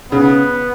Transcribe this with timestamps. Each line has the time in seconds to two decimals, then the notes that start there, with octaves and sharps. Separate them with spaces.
0.12 C#3 B3